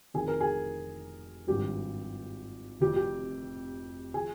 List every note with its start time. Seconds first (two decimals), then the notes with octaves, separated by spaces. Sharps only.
0.14 F1 F2 D#3 G#4
0.28 A#4
0.41 G#4
1.47 G#1 G2 F3 G4
2.80 F1 F2 C3 F3 G4
2.96 G4
4.14 F3 G#4